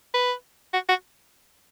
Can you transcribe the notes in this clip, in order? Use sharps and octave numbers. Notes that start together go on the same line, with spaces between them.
B4
F#4
F#4